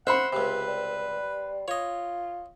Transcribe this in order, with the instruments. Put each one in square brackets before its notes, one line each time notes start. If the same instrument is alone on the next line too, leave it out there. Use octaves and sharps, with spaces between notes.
[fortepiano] C5 B5 [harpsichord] E5 C#6 [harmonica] F#5
[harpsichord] C#2 C3 [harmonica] B4
[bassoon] G3
[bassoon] F4 [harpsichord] C#5 D#5